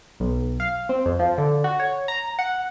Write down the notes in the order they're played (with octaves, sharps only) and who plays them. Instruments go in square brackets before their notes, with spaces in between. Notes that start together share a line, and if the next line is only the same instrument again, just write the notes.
[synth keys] B1
F5
C4
F2
F3
D3
F#4
C#5
A#5
F#5